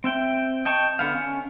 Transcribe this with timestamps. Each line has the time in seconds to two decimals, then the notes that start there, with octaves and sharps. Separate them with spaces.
0.04 C4 E5 G5
0.65 D#5 G5 A5 C#6
0.99 D3 B3 F5
1.15 C#4